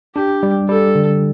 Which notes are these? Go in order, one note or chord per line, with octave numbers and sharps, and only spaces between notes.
D4 G4
G3
G3 A4
D3